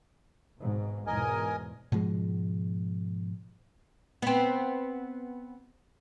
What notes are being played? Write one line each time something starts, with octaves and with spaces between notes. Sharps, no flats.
G#1 G#2 B2
E2 G#2 B2 A#4 D#5 G#5
G#2 B2 F3 G#3
B3 C4